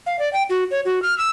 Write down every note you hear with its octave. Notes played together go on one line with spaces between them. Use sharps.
F5
D5
G5
F#4
C#5
F#4
F6
E6